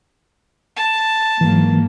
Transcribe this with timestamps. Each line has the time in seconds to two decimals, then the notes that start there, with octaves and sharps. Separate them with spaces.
0.77 A5
1.41 G#2 E3 F#3 A#3